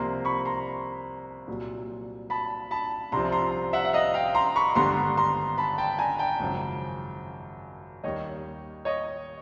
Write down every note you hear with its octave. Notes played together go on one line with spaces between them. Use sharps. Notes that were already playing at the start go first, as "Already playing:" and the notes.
Already playing: C2 C3 F3 A#3 A#5 C6
B5 C#6
A#5 C6
C2 A#2 F#3
A5 B5
A5 B5
C2 C3 F3 A#5 C6
A#5 C6
E5 F#5
F#5
D#5 F5
F5 G5
A#5 C6
B5 C#6
G#1 G2 D3 G3 B3 A#5 C6
A#5 C6
A5 B5
G5 A5
G#5 A#5
G5 A5
G#1 F#2 C#3 F3
D#2 D#3 G3 C#5 D#5
C#5 D#5